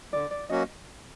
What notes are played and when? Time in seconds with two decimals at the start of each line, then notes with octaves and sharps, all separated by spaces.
0.13 D3 D5
0.31 D5
0.49 F#3 A#3 C#4 F#4 D#5